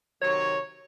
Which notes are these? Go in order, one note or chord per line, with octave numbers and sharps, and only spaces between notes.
C3 D#3 F#3 C#5